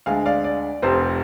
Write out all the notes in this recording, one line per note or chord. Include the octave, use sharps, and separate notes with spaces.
D2 D3 G#3 F5 G#5
D5 F5
D5
F1 F2 C3 C5